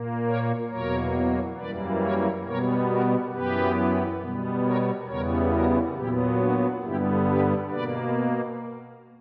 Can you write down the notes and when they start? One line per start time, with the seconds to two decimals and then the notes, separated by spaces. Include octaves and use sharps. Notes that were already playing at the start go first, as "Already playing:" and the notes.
Already playing: A#2 A#3
0.25 A#4 C#5
0.69 E2 B2 F#3 A#3 A#4 C#5
1.57 F#2 E3 G3 A#3 B4 D5
2.01 A#4 C#5
2.45 B2 G3 B3 A#4 C#5
2.88 F#4 A#4
3.32 F#2 E3 B3 G4 B4
4.21 B2 G3 B3
4.64 A#4 C#5
5.07 E2 C#3 E3 G3 B3 A#4 C#5
5.51 F#4 A#4
5.95 A#2 F#3 B3 E4 G4
6.40 D4 F#4
6.83 G2 D3 G3 B3 E4 G4
7.27 G4 B4
7.71 B2 A#3 B4 D5